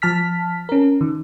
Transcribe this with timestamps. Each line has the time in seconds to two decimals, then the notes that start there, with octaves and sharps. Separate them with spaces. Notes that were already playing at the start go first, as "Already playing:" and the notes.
0.02 F3 A5 F6 B6
0.69 C#4 A#4
1.01 D#3